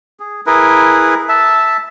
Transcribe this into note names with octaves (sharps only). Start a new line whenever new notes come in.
G#4
E4 G#4 A#4 B4
E5 A5